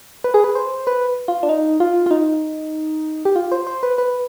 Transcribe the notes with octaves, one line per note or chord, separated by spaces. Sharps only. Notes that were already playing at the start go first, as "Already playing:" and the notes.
B4
G#4
B4
C5
B4
F4
D4
D#4
F4
F4
D#4
G4
F4
C5
C5
B4
B4